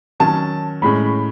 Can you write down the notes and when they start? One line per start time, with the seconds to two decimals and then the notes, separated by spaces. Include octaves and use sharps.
0.20 D#3 F#3 C#4 A5
0.82 A2 G#3 C#4 B5